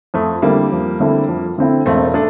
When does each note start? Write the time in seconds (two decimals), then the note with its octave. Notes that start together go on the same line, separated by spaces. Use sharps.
0.14 F2 F3 A3
0.42 D3 G3 A3 A#3 C4 E4
0.72 F2
1.00 D3 A3 C4 E4
1.28 F2
1.58 D3 A3 C4 E4
1.86 E1 A3 C4
2.14 A3 D4